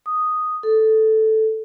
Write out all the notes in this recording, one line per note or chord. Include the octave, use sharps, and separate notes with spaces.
D#6
A4